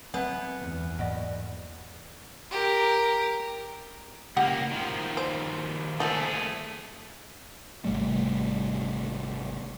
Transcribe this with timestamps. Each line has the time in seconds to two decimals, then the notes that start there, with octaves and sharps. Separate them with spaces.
0.14 F#3 G#3 B3 C4 E5
0.60 E2
0.99 G#2 F#3 A#3 D5 D#5 F#5
2.51 G4 A#4
4.37 C#2 A#3 G4 F#5 G5
4.71 D#3 F3
5.17 C5
6.00 F3 A3 A#3 G#4 A4
7.85 G#1 C3 G3 A3